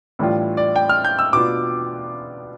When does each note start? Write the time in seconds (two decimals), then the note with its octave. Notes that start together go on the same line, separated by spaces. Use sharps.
0.19 A2 E3 G3 D4 F4
0.57 D5
0.76 G5
0.89 F6
1.04 G6
1.19 E6
1.33 B2 B3 D4 F4 D6